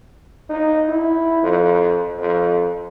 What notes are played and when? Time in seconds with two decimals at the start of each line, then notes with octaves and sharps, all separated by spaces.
0.49 D#4
0.89 E4
1.43 F2
2.18 F2